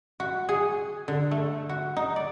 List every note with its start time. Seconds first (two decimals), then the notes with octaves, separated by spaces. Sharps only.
0.20 F#4
0.49 G#4
1.08 D3
1.31 A3
1.69 F#4
1.96 D#4
2.16 D5